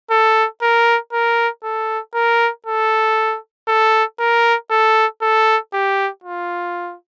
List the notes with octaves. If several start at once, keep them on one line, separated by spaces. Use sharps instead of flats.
A4
A#4
A#4
A4
A#4
A4
A4
A#4
A4
A4
G4
F4